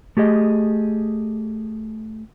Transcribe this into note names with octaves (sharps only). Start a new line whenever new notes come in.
A3 G4 G#4 D#5